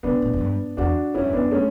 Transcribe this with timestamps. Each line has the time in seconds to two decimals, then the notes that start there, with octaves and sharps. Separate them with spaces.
0.03 C#3 B3 D4
0.22 A2
0.33 F#2
0.40 G2
0.77 E2 D4 F#4
1.14 F#2 C#4 E4
1.24 G2
1.33 F#2 B3 D4
1.51 A3 C#4